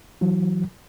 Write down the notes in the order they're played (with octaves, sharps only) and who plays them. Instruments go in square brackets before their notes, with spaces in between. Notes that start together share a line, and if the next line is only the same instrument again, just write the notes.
[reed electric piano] E3 F#3